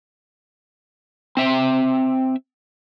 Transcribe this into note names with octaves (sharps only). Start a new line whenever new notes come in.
C4 E5 G5